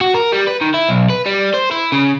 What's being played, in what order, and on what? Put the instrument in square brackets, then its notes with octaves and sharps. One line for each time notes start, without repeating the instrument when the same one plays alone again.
[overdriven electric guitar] F#4
A#4
G3
B4
D#3
E4
B1
B4
G3
C5
E4
C#3